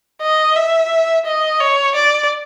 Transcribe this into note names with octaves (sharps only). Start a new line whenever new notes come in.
D#5
E5
D#5
C#5
D5